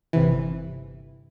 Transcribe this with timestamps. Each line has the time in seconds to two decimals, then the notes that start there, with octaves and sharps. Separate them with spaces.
0.13 G1 C3 E3